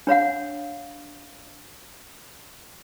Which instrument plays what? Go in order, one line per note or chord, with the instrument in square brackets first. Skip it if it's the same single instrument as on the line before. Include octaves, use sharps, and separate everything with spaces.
[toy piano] D4 C#5 F5 F#5